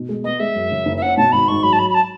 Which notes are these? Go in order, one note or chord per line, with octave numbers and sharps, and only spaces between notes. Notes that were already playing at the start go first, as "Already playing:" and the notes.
Already playing: B2
G#3
B3 D#5
G#3 E5
F#2
C#3
F#1
E5
C#4 F#5
B2 A5
G#1 B5
G#2 C#6
F#3 B5
A5
F#3 B5
B5
A5